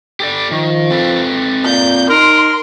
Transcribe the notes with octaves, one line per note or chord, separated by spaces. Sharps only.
G4 A4 D5
D#3 F3
C4 A4 B4
A#2 G6
D#4 A#4 C6